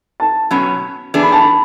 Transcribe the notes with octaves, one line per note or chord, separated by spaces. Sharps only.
A5
B2 F#3 C#4 B5
E3 B3 D4 G#4
B5
A5
B5